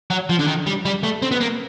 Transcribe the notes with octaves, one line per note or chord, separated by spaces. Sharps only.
F#3
F3
D3
D#3
G3
G3
A3
C4
B3
A#3